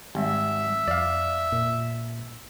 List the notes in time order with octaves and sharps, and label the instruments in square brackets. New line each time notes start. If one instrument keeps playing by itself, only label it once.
[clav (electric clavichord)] G#1 [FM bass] G3 [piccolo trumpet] E5
[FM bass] F2 [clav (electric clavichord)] D5 F5
[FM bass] A#2